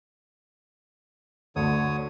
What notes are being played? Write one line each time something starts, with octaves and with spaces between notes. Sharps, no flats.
D2 D3 C#5 D#6